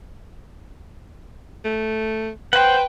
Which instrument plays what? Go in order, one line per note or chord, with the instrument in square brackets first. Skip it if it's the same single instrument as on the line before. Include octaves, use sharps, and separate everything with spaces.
[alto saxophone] A3
[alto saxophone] B4 [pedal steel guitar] C5 F#5 [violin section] G5